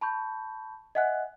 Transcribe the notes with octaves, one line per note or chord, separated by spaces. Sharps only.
A5 B5 C#6 G6
D#5 E5 F#5 G#5 F#6